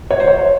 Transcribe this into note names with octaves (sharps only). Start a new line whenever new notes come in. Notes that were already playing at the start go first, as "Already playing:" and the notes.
C#5
C5
C#5